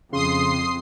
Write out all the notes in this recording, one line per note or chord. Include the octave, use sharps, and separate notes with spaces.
F2 C#3 C6 D#6 C7